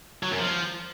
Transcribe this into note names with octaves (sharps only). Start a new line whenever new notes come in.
F#3
F#2
F3